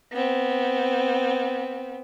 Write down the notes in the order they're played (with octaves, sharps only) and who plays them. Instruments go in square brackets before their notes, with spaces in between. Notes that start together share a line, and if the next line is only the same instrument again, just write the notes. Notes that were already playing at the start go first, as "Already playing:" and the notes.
[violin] B3 C4